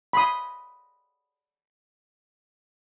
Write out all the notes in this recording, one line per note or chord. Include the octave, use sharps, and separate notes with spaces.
B5 C6 D#6